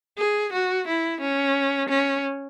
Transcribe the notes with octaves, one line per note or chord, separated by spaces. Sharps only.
G#4
F#4
E4
C#4
C#4